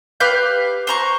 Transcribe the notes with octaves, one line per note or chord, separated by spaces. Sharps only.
G4 B4 F5 G6
C5 A#5 C#6